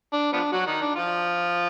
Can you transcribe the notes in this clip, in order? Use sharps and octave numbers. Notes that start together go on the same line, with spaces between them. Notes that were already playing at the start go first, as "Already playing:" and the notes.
D4
F3 B3 D4
F#3 F#4
D#3 D#4
D4
F3 F4